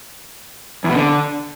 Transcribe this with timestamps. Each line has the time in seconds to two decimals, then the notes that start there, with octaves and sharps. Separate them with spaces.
0.84 E2
0.90 B2
0.95 D3